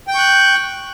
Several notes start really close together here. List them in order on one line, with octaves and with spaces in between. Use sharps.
G5 G6 C#6 F#6